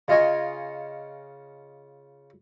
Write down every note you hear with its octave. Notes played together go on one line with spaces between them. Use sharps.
C#3 F4 D#5 G#5 C#6